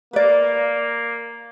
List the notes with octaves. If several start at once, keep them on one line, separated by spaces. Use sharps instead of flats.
A#3 B4 D5